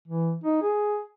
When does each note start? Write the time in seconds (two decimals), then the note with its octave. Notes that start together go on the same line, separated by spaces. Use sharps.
0.08 E3
0.44 D#4
0.62 G#4